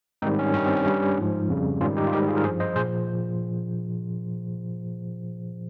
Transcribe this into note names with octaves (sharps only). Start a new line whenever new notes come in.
G#2 D#3 G3 C4 D#4
C#4
G2 D#3 G3 C#4
C4
C#4
G2 G3
G#2 F3
F2 C#3 G3
G#2 D#3 G3 C#4 F4
D#4 G4
F4
G#2 D#3 G3 D#4 G4
F4 G#4
A#4
G2 F3 G#4 C5
C5 D#5
A#2 F3 G#4 C5